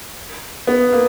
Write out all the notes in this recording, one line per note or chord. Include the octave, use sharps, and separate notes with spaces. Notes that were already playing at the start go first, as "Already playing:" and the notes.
B3
A#3